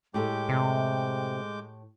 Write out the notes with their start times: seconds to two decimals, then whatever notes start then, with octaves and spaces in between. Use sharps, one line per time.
0.14 A2 G#3 G4 A4 G5 D6 G6
0.49 C3